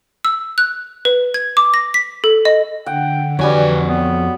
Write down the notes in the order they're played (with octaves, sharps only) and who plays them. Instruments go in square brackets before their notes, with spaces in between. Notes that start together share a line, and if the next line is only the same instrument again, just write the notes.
[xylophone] E6
F#6
B4
G#6
D6
A#6
B6
A4
D#5
[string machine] D3 [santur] F#5 [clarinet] G5
[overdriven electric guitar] F2 G#5 [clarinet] E3 [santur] G3 F#4 C#5
[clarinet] B3